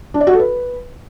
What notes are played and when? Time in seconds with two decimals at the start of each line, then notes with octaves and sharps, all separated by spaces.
0.14 D4
0.21 D5
0.27 F#4
0.33 A4
0.39 B4